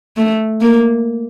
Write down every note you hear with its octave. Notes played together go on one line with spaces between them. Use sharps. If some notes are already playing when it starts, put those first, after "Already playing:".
A3
A#3